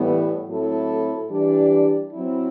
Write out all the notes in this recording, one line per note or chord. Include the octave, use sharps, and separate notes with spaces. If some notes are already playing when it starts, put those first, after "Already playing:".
Already playing: A2 E3 G3 B3
A2 F#3 C4 E4 A4
E3 G3 D4 G4 D5
F#3 C4 E4